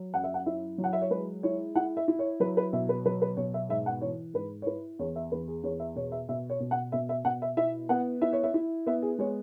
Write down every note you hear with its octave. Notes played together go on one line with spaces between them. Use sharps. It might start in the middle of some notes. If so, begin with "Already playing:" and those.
Already playing: F#3
F#2 F#5
E5
F#5
E4 E5
F#3
F#5
E5
C#5
G#3 B4
E4 C#5
E4 F#5
E5
E4
C#5
F#3 B4
B4
B2 E5
B4
F#3 B4
B4
B2 C#5
E5
G#2 E5
F#5
E3 C#5
G#2 B4
C#5
E4 B4
E2 C#5
E5
E2 B4
G#4
E2 C#5
E5
B2 C#5
E5
B2 E5
C#5
B2
F#5
B2 E5
E5
B2 F#5
E5
E4 E5
B3 F#5
E4 E5
C#5
E5
E4
B3 E5
G#4
G#3 C#5